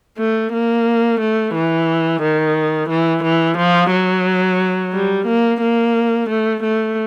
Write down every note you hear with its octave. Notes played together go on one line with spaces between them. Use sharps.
A3
A#3
A3
E3
D#3
E3
E3
F3
F#3
G3
A#3
A#3
A3
A3